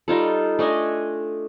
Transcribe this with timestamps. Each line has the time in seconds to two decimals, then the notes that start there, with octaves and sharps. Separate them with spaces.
0.08 G3 D#4 F4 A4
0.59 A3 D4 D#5 G#5